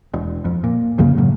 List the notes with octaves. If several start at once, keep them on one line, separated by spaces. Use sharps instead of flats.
E1
F2
A#2
C2 F#2 C#3 A#3
A2 C#3 F#3